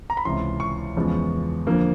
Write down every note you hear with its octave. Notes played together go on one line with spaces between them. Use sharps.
A#5
B5
C#2 C3 E3 C6
C#6
E2 C#3 F3 G#3 B3
F2 D3 F3 A#3